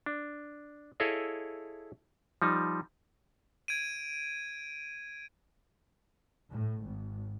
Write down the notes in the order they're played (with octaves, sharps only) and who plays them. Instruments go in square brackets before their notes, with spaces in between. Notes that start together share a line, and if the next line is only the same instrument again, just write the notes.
[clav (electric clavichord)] D4
E4 G#4 A4 C#5 D#5 F5
F3 G3 D#4
[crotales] G#6 D7 D#7
[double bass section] A2
G#1